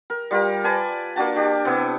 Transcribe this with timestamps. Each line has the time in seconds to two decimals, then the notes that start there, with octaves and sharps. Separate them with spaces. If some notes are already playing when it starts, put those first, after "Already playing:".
0.10 A#4
0.31 G3 F4 G4 A#4
0.64 B4 D5 G#5 A5
1.16 A#3 D4 F#4 A5
1.36 D4 G4
1.65 C3 B3 E4